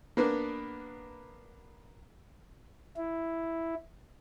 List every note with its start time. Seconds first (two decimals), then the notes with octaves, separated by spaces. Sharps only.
0.17 A#3 B3 D4
2.97 E4